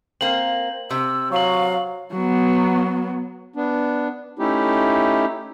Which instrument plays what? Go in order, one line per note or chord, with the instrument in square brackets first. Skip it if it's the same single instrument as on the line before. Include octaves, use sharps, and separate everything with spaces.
[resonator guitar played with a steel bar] A#3 C4 [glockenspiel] F#7
[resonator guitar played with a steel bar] C3 [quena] E6
[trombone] F#3 [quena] F5 [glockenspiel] C#6 F#7
[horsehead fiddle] F#3 B3
[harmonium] B3 D4
A3 C#4 D#4 E4 G4